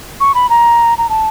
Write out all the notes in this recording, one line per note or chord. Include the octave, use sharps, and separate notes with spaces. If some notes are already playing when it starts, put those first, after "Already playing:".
C#6
B5
A#5
A#5
A5